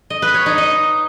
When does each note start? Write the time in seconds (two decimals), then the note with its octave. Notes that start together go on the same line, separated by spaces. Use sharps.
0.10 D#5
0.22 B4
0.34 C#5
0.46 D#4
0.58 D#5